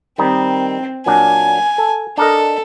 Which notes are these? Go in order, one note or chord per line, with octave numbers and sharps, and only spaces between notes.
D#3 G3 C4 D#4
A#2 F#3 D4 G#5
A4
D4 A4 A#4 D#5